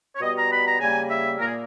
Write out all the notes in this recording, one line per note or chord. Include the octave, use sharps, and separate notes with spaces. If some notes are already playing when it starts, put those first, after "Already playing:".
C#5
B2 G3 B3 D#5
A#5
B5
A#5
C#3 G3 A#3 G#5
E5
A#2 A#3 A#4
G#4